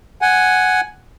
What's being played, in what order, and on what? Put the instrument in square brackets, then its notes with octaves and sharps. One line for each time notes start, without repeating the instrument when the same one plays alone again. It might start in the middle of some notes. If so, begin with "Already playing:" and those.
[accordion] F#5 G#5